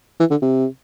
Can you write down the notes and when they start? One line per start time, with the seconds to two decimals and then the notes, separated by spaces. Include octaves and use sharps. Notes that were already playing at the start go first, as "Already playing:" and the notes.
0.20 E3
0.31 D3
0.42 C3